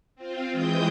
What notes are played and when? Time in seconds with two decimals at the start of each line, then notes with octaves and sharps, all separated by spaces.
0.15 C4 F4
0.52 E3 G#3 G5 D#6 G6